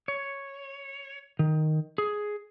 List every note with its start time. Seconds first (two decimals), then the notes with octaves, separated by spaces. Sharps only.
0.08 C#5
1.39 D#3
1.98 G#4